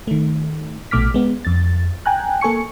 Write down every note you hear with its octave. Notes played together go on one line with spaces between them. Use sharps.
D#3 A3
A#1 B2 A3 D6 F6 B6
G#3 B3
F2 A6
G5 G#5 A#5 F#6
A#3 A4 G#5 C#6 C#7